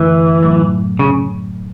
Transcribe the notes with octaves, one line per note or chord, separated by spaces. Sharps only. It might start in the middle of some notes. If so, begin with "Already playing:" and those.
Already playing: F#2 D3 E3 A3
A2 F#3 A3
C#3